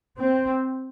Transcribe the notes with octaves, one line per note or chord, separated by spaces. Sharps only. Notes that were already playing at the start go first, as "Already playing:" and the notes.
C4